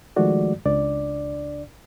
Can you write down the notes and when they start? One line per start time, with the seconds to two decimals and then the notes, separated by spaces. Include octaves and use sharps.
0.16 D#3 F3 G#3 A3 F#4 D5
0.66 C#2 D4 D5